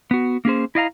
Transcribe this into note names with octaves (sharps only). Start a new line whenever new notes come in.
B3 F#4
A#3 C#4 G#4 C5
E4 D#5 F5 A#5